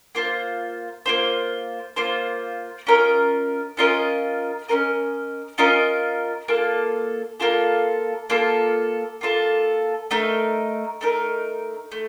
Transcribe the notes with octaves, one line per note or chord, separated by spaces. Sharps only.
A#3 F4 C5
A#3 F4 C5
A#3 F4 C5
C#4 F4 A#4 D#5
C#4 F4 A#4 D#5
C#4 F4 A#4 D#5
C#4 F4 A#4 D#5
A#3 F4 A4
A#3 F4 A4
A#3 F4 A4
A#3 F4 A4
A3 D#4 A#4
A3 D#4 A#4
A3